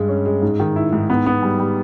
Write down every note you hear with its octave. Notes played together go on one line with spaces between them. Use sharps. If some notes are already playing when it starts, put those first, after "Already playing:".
Already playing: G2 G#3
C#4
G#3
G#2
D#3
E4
G#2
B3
B3
G3
G3